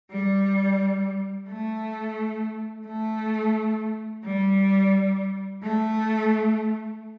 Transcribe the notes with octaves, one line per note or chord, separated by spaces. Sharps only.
G3
A3
A3
G3
A3